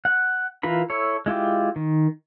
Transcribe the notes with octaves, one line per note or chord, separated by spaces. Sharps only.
F#5
E3 F4 A#4 B5
E4 A4 C#5
G#3 E4 F4 G4
D#3